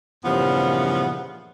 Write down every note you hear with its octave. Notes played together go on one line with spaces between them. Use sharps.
G2 A#2 C#3 E3 F3 B3